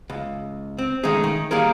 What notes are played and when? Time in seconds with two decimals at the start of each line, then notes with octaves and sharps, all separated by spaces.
0.10 C#2
0.78 C4
1.03 D#3 G#3 A3 C#4 D#4 G#4
1.24 D#3
1.51 D#3 G3 A#3 D#4 G#4 A#4